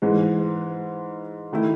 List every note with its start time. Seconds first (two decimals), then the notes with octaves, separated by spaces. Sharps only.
0.02 G#2 E3 G#3
1.53 D#3 A3 E4